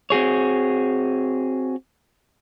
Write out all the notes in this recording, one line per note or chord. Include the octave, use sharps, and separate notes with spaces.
C4 F#4 G#4 C#5